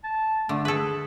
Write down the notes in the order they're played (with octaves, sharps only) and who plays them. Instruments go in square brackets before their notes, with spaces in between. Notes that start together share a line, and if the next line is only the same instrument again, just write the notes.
[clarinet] A5
[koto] D3 [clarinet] A3
[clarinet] G#4 [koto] A4 B4